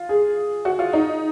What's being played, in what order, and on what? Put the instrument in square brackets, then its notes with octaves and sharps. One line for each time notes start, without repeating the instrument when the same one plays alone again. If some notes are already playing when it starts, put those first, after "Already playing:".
Already playing: [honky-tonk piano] F4
G#4
F#4
F4
D#4